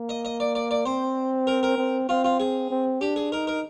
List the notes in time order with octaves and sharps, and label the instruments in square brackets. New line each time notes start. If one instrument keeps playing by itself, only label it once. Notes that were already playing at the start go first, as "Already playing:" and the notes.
Already playing: [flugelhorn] A#3
[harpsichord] D#5
D#5
D5
D5
D5
[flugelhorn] C4 [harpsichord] C5
[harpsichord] A#4
A#4
[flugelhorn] C4
[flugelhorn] C4 [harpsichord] F4
[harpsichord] F4
G#4
[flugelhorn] C4
[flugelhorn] D4 [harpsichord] G4
[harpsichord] G#4
[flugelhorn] D#4 [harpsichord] A#4
[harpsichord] A#4